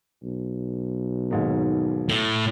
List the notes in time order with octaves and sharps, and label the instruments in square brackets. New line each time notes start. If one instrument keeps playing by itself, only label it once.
[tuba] B1
[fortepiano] D#2 G#2 D#3
[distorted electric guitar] A2